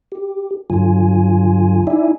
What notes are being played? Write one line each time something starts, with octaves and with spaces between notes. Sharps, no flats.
G4
G2 D3 F#3 F4 G#5
D#4 E4 D5 E5 G#5